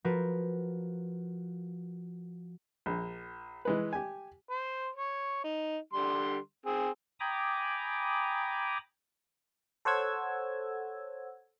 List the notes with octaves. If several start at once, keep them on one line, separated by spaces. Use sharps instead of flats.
F3 F#4 A#4 B4
A#1
E3 G#3 B4
G4 G#5
C5
C#5
D#4
D3 G3 C6
C4 G#4
G5 G#5 A#5 B5 D6 D#6
A4 C5 C#5 F#5 E6 G#6